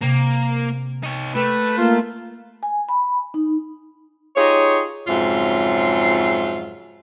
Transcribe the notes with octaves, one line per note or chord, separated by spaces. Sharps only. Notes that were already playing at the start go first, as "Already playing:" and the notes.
C3 A#3
D#4 C#5
A3 A#3 G4 B4
A#3 F4 C6
G#5
B5
D#4
D#4 F4 G4 G#4 C#5
F2 G#2 C#3 F#3 F4 E5